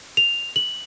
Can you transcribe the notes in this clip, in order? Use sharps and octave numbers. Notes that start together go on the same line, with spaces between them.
F7
F#7